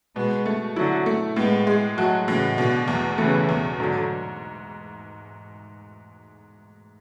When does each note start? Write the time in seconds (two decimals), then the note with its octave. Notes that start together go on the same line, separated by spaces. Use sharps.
0.16 B2 G#3 B3
0.46 A3
0.76 D3 F#3 E4
1.06 A3
1.36 A2 G#3 B3
1.67 G#3
1.97 F#3 A3 F#4
2.27 A2 C#3 E3
2.58 B2 D3
2.88 E2
3.18 C#3 E3 A3
3.49 E2
3.79 G#2 D3 F#3